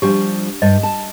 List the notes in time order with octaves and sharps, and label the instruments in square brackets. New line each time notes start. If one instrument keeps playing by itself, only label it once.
[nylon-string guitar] F3 G3 F4 [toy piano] D4 G4
[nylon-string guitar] G2 [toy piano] D#5
[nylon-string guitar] A5